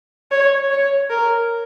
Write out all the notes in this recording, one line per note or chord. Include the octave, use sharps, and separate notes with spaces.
C#5
C#5
A#4